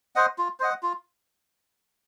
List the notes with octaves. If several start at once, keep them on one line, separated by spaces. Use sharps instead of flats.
C5 D#5 F#5
F4
C5 D#5 F#5
F4